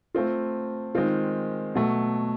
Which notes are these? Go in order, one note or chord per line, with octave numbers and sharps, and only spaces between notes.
A3 C4 F4
D#3 G#3 C4 F4
B2 F#3 A3